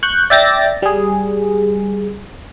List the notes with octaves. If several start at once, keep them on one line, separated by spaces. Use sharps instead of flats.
C#6 F#6 G6
D5 E5 G5 A6 A#6
G3 G#4